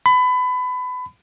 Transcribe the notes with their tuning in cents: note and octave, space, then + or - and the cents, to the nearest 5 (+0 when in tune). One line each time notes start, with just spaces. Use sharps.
B5 +25